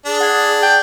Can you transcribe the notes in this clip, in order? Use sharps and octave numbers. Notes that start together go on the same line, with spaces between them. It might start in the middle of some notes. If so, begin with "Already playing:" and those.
D4 G#4
F#5 G#6
G5